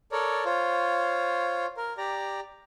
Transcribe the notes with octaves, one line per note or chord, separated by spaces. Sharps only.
A4 A#4 C#5 D5
F4 C5 C#5
A#4
G4 D5 A#5